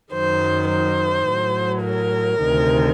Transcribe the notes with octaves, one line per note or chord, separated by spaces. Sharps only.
F#2 D#3 F#3 C5
C5
A2 F#3
A#4
D2 C3 D#3